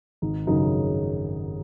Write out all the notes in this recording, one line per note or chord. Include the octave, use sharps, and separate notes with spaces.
G#1 D#4
F#2 C#3 D#4